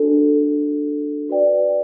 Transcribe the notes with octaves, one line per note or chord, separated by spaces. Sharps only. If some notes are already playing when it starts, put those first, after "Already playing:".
Already playing: D4 F#4 A4
F#4 B4 D5 G5